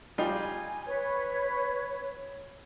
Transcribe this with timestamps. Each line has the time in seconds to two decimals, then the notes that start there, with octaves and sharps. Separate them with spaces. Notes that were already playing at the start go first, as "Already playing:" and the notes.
0.18 G3 D#4 F4 G#5
0.86 B4 C#5